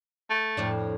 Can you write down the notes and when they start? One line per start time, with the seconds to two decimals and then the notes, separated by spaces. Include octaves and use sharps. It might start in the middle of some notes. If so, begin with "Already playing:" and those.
0.30 A3
0.57 F2 A2 D4